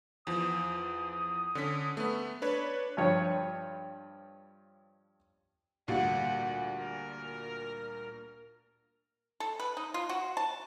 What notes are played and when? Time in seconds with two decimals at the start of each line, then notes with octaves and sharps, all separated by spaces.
0.27 E2 F3 D#6
1.55 D3 C#4 B6
1.97 A3 B3
2.42 D4 B4 C#5
2.97 G2 F3 C#5
5.88 D2 A#2 G3 F#5
6.78 A#4
9.40 A4
9.60 B4
9.77 D#4
9.94 F4
10.09 F#4
10.37 A5